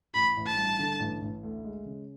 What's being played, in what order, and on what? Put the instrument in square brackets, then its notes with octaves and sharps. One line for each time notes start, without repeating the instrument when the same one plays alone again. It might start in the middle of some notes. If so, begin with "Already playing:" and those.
[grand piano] A1 [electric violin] B5
[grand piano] A1
[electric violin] A5
[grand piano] G2
D3
A1
A1
D2
G#3
C#3